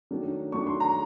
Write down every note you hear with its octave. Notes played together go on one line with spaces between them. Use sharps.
D#3 F#3 A3 D4
D#3 F#3 A3 D4 C#6
C6
A#5